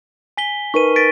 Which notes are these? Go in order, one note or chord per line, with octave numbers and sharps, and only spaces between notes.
G#5 B6 G7
D#4 A#4 B4 C#6 D#7
A6 B6 D7